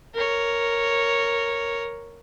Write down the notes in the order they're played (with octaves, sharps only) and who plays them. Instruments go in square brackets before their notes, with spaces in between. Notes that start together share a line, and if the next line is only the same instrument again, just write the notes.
[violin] A#4 C#5